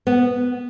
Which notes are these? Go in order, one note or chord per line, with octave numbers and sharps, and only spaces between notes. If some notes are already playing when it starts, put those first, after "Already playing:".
B3